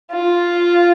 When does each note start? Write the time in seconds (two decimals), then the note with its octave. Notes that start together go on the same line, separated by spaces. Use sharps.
0.11 F4